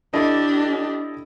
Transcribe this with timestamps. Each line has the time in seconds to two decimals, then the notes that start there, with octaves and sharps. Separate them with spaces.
0.13 D4 E4 G4 A4 D#5